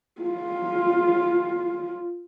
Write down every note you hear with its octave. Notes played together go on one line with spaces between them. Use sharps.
F4